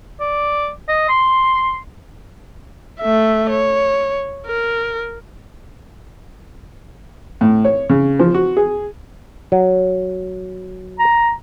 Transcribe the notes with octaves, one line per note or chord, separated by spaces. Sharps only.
D5
D#5
C6
A3 E5
C#5
A#4
A2
C#5
C#3
F3
F#4
G#4
F#3
A#5